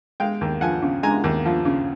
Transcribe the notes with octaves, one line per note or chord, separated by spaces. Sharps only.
G#3 F5 G5
D#2
F3 F#5 G#5
C#3
G#3 G#5 A#5
D#2
F3
C#3